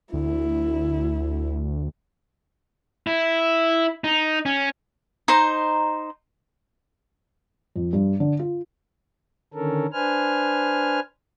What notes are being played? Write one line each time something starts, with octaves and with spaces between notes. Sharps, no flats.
D2 E4
E4
D#4
C#4
D#4 C5 A#5
F2
G2
D3
F4
D3 D#3 C#4 A4 A#4
D4 B4 C5 G#5 F6